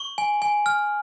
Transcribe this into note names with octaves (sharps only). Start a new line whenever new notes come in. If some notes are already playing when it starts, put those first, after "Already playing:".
Already playing: C#6 F#7
G#5
G#5
F6